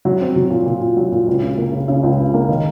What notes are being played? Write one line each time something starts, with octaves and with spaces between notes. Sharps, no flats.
F#3
C4
F#3
A#2
A#2
A#2
F#3
A#2
C#2
C#3
A#3
C#3
C#3
C#2
C#3
A#3
D#3